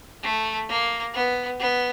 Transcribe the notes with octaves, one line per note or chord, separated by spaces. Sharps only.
A3
A#3
B3
B3